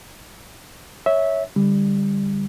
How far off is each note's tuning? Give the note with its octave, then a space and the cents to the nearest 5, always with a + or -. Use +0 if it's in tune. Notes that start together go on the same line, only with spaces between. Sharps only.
C#5 +0 E5 -15
D3 +0 G3 +20